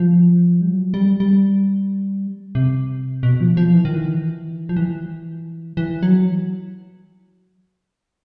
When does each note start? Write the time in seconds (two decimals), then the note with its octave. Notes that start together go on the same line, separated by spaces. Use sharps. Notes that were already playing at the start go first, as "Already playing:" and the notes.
Already playing: F3
0.61 G3
0.69 F#3
0.94 G3
1.20 G3
2.55 C3
3.23 B2
3.41 F3
3.57 F3
3.74 E3
3.85 D#3
3.95 E3
4.69 F3
4.77 E3
5.77 E3
6.03 F#3